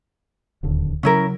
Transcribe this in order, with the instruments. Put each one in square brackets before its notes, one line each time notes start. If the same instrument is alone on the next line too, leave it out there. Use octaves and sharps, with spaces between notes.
[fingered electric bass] D1 D#2 D3
[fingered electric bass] C#3 F#3 [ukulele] C#4 E4 A#4